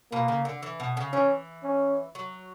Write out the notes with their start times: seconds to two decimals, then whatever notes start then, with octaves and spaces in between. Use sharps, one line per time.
0.12 B2 A#3
0.28 C#3
0.45 D3
0.62 E3
0.80 B2
0.97 C#3
1.13 E3 C#4
1.64 C#4
2.15 F#3